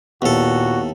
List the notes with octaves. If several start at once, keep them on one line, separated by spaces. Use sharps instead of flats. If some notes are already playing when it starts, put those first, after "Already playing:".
D#2 A#2 B3 E4 F#4 A4